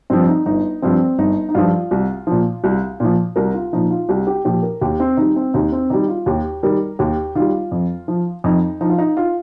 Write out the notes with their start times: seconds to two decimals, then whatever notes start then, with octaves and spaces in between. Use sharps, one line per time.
0.10 G2 F3 C4
0.28 D#4
0.46 G1 D#4
0.82 G2 F3 C4
1.18 G1 D#4
1.49 D#4
1.55 G2 F3 F4
1.91 C2
2.27 A#2 F3
2.64 C2
3.00 A#2 F3
3.36 C2 A#4
3.54 F4
3.73 A#2 F3 D#4
3.91 F4
4.09 C2 G4
4.27 G4
4.45 A#2 F3 G4
4.63 A#4
4.81 D#2 G4
5.00 C4
5.17 D#3 G3 D#4
5.36 C4
5.54 D#2 D#4
5.72 C4
5.90 D#3 G3 D#4
6.08 F4
6.26 D#2 G4
6.63 D#3 G3 A#4
6.99 D#2 G4
7.35 D#3 G3 F4
7.72 F2
8.08 F3
8.44 F2 D#4
8.81 F3 D#4
8.90 F4
8.98 D#4
9.17 F4